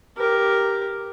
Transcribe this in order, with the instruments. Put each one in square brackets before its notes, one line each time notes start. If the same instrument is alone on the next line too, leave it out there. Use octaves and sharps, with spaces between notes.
[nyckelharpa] G4 A#4